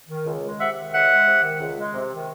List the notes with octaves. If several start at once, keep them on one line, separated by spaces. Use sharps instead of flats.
D#3
C#2
G#3
C3 E5 F#5
D#3
C#2 E5 F#5
G#3
C3
D#3
C#2
G#3
C3
D#3